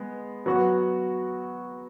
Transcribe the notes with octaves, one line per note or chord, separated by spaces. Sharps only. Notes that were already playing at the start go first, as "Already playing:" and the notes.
Already playing: G#3 B3
F#3 B3 F#4